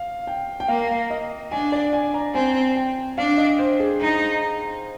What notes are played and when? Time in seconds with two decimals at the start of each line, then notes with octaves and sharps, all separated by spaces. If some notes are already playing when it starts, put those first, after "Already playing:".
Already playing: F5
0.27 G5
0.60 G5
0.68 A#3 F5
1.10 D#5
1.52 D4 G#5
1.72 D5
1.93 G#5
2.14 A#5
2.34 C4 G#5
2.76 G5
3.17 D4 F5
3.38 D#5
3.59 C5
3.80 G#4
4.01 D#4